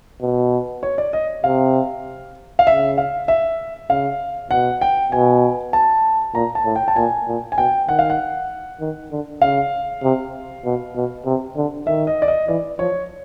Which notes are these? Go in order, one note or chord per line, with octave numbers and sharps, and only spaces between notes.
B2
C#5
D5
D#5
C3 F5
F5
C#3 E5
F5
E5
C#3 F5
B2 F#5
G5
B2 G#5
A5
A#2 A#5
A5
A2
G5
A5
A#2 G#5
A#2
G#5
B2 G5
D#3 F#5
F5
F#5
D#3
D3
C#3 F5
C3
B2
B2
C3
D3
D#3 E5
D#5
D5
D#5
E3 D5
F3 C#5